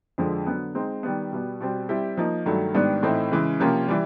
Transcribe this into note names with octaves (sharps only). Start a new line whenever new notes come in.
F2 D3 F3 G#3
D3 F#3 B3
G#3 C4 D#4
D#3 G3 B3
B2 G3 B3
B2 G3 C4
G3 C4 E4 G4
F3 A#3 D#4
G2 D#3 F#3 A3
G#2 D#3 G3 B3 D4
A2 E3 A3 C4 D#4
C#3 E3 G#3
C3 F3 A#3 C#4 F4
E3 G3